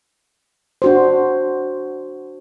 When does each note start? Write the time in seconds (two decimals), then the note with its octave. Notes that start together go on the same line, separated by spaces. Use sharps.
0.82 D4 F#4 C5